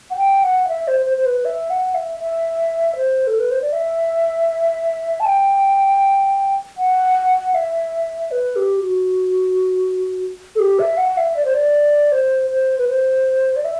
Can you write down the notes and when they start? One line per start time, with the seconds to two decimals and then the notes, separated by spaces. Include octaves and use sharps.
0.10 F#5
0.17 G5
0.43 F#5
0.64 F#5
0.68 E5
0.88 C5
1.06 C5
1.17 C5
1.26 B4
1.45 E5
1.70 F#5
1.95 E5
2.20 E5
2.96 C5
3.27 A4
3.39 B4
3.51 C5
3.62 D5
3.73 E5
5.20 A5
5.25 G5
6.78 F#5
7.54 E5
8.31 B4
8.56 G4
8.81 F#4
10.55 A4
10.59 G4
10.79 E5
10.97 F#5
11.17 E5
11.36 D5
11.45 C5
11.54 D5
12.12 C5
12.50 C5
12.78 B4
12.89 C5
13.56 D5
13.65 E5